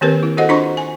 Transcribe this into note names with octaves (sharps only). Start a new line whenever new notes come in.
D#3 A#3 C4 G4 A#4 B4
E4
F#4 A4 C5 D#5 F#5
D4 F4 C5 A#5 C6 C#6
G#5